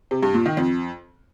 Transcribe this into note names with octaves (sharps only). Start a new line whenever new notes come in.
C3
G2
A#2
D#3
F2